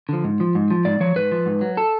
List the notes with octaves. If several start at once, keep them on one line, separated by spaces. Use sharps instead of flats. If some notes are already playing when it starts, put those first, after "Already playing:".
D3 F3
G#2
F3
G#2
F3
G#2 D5
F3 C#5
G#2 B4
F3
G#2
F#3
A4